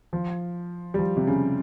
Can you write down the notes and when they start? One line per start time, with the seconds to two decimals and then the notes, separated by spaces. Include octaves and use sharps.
0.13 F3
0.94 G3
0.99 F3
1.17 C3
1.27 C#3